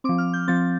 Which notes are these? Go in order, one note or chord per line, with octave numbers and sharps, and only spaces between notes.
F3 C4 D6
F6
G6
F3 C4 A6